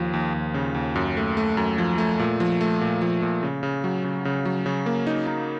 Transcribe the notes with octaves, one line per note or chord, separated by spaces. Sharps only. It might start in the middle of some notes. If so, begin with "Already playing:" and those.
Already playing: D#2 F3
D#2
D#2
C#3
D#2
F#2
A3
A3
F#2
F3
A3
A#2
F3
A3
A#2
F3
A#2
C#3
C#3
F#3
C#3
C#3
F#3
C#3
A#3
D#4
D#4